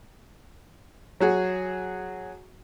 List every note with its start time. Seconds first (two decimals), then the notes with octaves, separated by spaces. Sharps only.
1.20 F#3 F#4 G#4